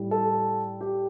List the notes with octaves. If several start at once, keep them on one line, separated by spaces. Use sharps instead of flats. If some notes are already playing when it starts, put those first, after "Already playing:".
Already playing: A2 G3
A4
G4